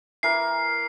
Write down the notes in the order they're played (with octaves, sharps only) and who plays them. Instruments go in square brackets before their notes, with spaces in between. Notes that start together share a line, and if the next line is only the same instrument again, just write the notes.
[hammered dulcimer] E3 A#4 [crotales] C7